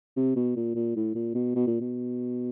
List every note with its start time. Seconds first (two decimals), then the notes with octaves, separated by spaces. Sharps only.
0.16 C3
0.36 B2
0.56 A#2
0.75 A#2
0.96 A2
1.15 A#2
1.35 B2
1.55 B2
1.67 A#2
1.81 B2